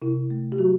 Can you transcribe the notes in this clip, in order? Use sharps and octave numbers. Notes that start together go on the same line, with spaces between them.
C3 E4
A3
G4
F#3 F#4